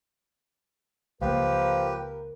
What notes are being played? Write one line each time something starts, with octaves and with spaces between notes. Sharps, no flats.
C#2 F3 A#3 G4 A#4 B4